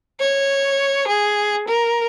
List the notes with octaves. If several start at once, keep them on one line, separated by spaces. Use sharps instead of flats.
C#5
G#4
A#4